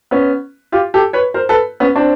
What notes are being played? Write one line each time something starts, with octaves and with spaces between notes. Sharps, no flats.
B3 C#4
F4 G4
G4 A4
B4 C#5
A#4 C5
A4 B4
B3 C#4
C4 D4